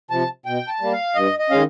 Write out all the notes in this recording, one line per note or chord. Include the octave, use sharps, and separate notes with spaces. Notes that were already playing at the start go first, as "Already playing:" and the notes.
C3 F3 A5
B2 G5
A5
G3 A#3
F5
G2 D#5
D#5
D#3 G#3 C#4 F5